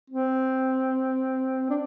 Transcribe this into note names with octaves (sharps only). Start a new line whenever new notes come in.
C4
D4